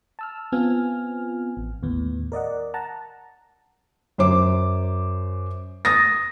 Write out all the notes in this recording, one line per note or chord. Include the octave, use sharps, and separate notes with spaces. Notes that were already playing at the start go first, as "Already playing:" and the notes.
A5 E6 F6
B3 C4 F4 G#5 F6
A1
D#2 A2 B3
A#4 D5 D#5 F#5
F#5 A5 A#5
F#2 C5 D6
D#6 A6 A#6